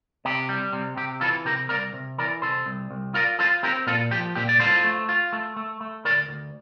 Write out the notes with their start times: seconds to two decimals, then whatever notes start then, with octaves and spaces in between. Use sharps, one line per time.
0.25 C3 G4
0.49 G3
0.73 C3
0.97 C3 G4
1.21 E3 F4 A4
1.45 C3 G4 A#4
1.69 C2 A#4 D5
1.93 C3
2.18 E3 A#4 D5
2.42 C3 A4 C5
2.66 C2
2.91 C2
3.14 F4 A#4 D5
3.39 F4 A4 C5
3.63 C4 G4 A#4
3.87 A#2 F4 A4
4.11 F3 G4
4.35 A#2 G4
4.49 D5
4.60 F4 A4 C5
4.84 A3
5.09 F4
5.33 A3
5.56 A3
5.81 A3
6.05 D2 A#4 D5
6.29 D2